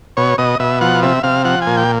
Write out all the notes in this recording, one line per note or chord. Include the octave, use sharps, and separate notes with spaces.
B2 C#5
B2 D#5
B2 E5
F3 F#5
C3 E5
C3 F5
F3 F#5
G#5
A#2
G5